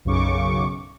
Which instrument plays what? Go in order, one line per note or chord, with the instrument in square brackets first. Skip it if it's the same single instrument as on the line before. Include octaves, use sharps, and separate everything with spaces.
[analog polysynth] B1 F#2 C#3 C#6 D6